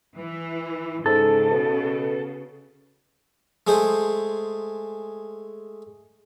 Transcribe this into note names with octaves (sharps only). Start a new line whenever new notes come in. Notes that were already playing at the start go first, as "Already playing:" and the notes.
E3
G#2 C#3 A4
B2
G#3 A3 G#4 C5